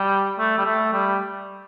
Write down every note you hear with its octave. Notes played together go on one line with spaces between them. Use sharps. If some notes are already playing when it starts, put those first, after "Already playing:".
Already playing: G3
A3
G3
A3
G3